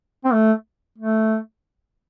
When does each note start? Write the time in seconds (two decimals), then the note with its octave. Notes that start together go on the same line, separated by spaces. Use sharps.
0.25 C4
0.33 A3
0.98 A3